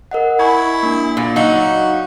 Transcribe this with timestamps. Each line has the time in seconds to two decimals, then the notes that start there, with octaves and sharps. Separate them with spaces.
0.11 A#4 D#5 F#5
0.39 E4 G#5 C#6 G#6
0.83 A#3 D4
1.17 A#2
1.36 F#3 D#4 F#4 F5